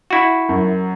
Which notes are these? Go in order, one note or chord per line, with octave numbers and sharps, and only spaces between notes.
E4 F#4
F#2